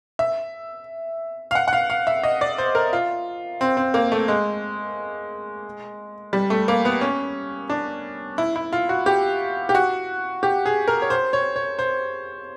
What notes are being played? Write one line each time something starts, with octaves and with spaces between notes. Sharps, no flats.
E5
F5
F#5
F#5
F5
F5
E5
D#5
D5
C5
A#4
F4
C4
C4
A#3
A3
G#3
G3
A3
A#3
B3
C#4
D4
E4
E4
F4
F#4
G4
G4
F#4
G4
G#4
A#4
C#5
C5
C#5
C#5
C5